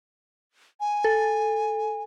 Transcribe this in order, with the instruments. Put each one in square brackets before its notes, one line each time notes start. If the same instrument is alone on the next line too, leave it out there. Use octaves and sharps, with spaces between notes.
[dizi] G#5
[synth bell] A4